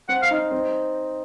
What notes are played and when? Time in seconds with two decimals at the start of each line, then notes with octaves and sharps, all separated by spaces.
0.09 C4 F#5
0.23 F5
0.31 D#4
0.51 C4